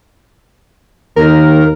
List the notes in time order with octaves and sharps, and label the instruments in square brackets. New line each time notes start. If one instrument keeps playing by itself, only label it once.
[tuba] D#2 [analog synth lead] A#4